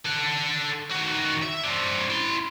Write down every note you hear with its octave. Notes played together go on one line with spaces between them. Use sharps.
A4 F#5
D#3 F#4
E5
C4 D4
E4 C6